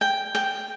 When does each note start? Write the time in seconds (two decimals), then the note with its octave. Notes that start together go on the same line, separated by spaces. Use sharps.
0.01 G5
0.35 G5